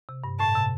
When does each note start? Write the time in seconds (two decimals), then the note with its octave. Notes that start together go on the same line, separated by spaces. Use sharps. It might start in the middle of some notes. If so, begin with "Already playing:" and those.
0.09 C3
0.24 G2
0.40 A2 A5
0.55 C3